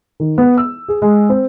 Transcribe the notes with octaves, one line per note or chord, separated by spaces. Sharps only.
D#3
B3
E6
G#4
G#3
C4